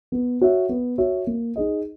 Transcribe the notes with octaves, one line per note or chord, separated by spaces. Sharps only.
B3
F#4 C#5 E5
B3
F#4 C#5 E5
A#3
D#4 G#4 D#5